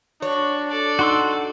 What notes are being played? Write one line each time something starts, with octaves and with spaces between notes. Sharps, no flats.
D4 F#4 C#5
A4 D5
D#4 F#4 C6 E6